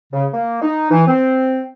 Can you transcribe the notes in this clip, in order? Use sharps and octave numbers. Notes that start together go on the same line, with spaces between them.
C#3
A#3
D#4
E3
C4